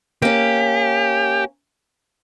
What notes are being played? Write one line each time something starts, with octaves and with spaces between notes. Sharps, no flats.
A#3 C#4 G4